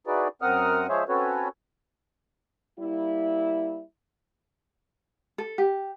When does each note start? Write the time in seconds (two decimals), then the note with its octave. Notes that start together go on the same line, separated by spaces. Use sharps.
0.07 D#4 E4 F#4 G#4 B4 D5
0.42 F#2 C4 A#4 F#5 D#6 F6
0.89 F3 G#3 G#4 C5 C#5 E5
1.09 C4 C#4 F#4 A4 B4 C#5
2.79 G3 A#3 E4
5.38 A4
5.58 G4